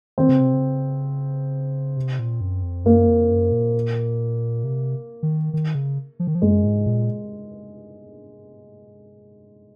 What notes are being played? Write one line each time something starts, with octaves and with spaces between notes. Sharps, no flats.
D#3 C4
C#3
C3
C#3
C3
A#2
F#2
F2
F#2 A#3
F2
F#2
A#2
C3
D#3
D#3
C#3
F3
D#3
F3
F#2 G#3
G#2
A#2